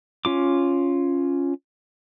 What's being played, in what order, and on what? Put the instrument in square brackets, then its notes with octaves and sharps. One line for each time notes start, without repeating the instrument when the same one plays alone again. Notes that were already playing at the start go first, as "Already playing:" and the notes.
[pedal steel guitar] C#4 F4 D6